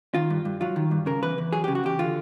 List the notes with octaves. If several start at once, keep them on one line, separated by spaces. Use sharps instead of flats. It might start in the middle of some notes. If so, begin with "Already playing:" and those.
D#3 F4
G2
G2
F#3 F4
D#3
G2
C#3 A#4
E2 B4
E2
F#3 G#4
C#3 G4
F#4
E2 G4
D3 F4